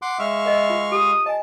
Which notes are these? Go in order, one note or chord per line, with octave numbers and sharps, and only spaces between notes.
F#5 C6 D6
G#3 E5 F5 C#6
A#4 D#5
F4
G4 D#6
D#5 G#5 A5